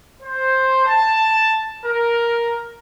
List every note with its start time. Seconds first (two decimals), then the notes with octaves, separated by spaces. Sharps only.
0.23 C5
0.86 A5
1.85 A#4